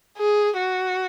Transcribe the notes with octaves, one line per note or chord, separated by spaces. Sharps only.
G#4
F#4